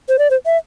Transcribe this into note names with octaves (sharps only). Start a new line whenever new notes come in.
C5
D5
C5
E5